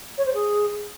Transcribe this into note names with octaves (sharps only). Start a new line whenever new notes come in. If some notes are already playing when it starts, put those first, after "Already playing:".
C#5
C5
G#4